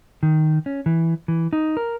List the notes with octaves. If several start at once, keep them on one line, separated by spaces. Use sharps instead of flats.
D#3
C#4
E3
E3
D#4
A#4